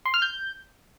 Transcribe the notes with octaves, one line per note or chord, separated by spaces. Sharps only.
C6
F6
G6